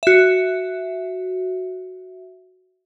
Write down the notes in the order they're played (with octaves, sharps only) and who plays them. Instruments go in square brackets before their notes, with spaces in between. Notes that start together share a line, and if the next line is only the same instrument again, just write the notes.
[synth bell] F#4 E5